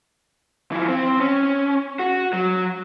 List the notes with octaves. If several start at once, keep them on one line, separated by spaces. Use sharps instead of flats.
E3 F3
C4
C#4
F#4
F#3